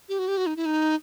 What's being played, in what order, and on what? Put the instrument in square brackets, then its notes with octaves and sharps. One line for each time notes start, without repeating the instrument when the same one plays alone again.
[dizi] G4
F#4
G4
F#4
D#4
E4
D#4